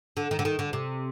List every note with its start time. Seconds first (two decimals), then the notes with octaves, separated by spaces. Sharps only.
0.17 D3
0.31 D#3
0.39 D3
0.45 D#3
0.59 D3
0.73 C3